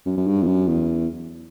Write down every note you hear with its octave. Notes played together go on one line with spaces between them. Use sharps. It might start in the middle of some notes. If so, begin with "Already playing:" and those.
F#2
F#2
G2
E2
F#2
E2